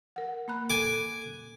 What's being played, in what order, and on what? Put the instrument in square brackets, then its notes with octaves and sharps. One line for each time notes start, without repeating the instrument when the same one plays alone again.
[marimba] A#4 F#5
A#3 B5 F#6
[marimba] A4 [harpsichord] G#5 D6